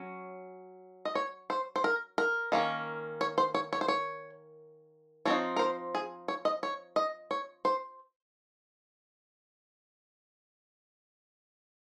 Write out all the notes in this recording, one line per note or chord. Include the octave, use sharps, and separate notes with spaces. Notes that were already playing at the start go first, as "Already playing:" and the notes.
Already playing: F#3 C#4
D#5
C#5
C5
C5
A#4
A#4
D#3 A#3 C#4
C#5
C5
C#5
C#5
C5
C#5
F3 C4 D#4 C#5
A#4
C5
G#4
C#5
D#5
C#5
D#5
C#5
C5